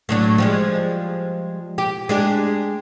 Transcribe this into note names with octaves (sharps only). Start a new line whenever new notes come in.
A2 F#3 D4
F3 G3 G#3
G4
G#3 D4 G4